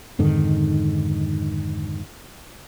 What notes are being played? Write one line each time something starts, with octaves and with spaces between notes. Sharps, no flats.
F2 G#2 D3 D#3